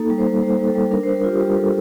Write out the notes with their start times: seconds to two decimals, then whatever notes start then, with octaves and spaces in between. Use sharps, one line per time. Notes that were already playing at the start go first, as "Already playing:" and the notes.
Already playing: A#3 D#4 A4
0.10 G3
0.18 C5
0.26 G3
0.42 G3 C5
0.59 G3
0.67 A4
0.75 G3
0.91 D4 A#4
1.03 G3 C5
1.16 A#4
1.24 F4 G4
1.40 G3 G4
1.56 G3 A4